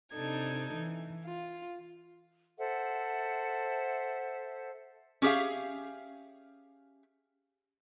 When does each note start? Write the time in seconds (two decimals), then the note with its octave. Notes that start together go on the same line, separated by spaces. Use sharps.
0.12 C3 D4 D#4 A4 G#6
0.73 E3
1.25 F4
2.59 A4 C5 E5 F#5
5.22 C#4 G4 G#4 E5 F5